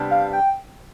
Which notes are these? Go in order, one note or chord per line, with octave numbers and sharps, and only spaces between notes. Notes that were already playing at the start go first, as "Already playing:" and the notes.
Already playing: C3 G3 B3 D4
F5
G5